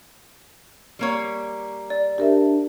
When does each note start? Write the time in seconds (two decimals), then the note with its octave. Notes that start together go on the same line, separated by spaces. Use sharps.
0.99 G3 A#3 C#5
1.90 D5
2.18 D4 G4 A#4 E5